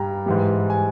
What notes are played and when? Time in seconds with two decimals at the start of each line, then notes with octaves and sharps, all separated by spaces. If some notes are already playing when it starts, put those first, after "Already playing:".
Already playing: G2 G3 G5 A#5
0.26 G#2 E3 G3
0.70 G#5